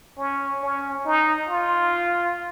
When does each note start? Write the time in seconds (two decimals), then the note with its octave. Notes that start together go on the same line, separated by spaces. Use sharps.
0.18 C#4
0.62 C#4
1.06 D#4
1.49 F4